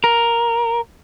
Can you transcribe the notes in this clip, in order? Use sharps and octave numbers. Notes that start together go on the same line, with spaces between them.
A#4